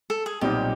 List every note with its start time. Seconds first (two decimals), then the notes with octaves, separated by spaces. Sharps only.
0.10 A4
0.26 G#4
0.41 B1 A#2 G3 C4 D#4 G4